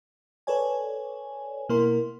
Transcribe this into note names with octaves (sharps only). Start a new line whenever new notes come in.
A4 B4 C#5 D5 G#5
B2 A#3 E4 A#4 C6